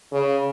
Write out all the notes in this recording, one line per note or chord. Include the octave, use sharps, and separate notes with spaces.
C#3